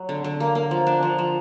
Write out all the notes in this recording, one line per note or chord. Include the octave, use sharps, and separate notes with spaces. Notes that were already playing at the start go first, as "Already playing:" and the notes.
Already playing: F#3
D3
D3
A#3
A#3
F3
D4
F3
F3